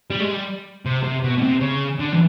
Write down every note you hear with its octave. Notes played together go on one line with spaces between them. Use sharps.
G3
G#3
G3
C3
C3
B2
B2
C3
C#3
D3
E3